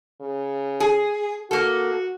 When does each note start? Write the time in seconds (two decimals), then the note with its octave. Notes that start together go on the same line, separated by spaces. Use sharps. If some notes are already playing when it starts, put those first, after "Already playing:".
0.21 C#3
0.80 G#4
1.51 A#3 F#4 A4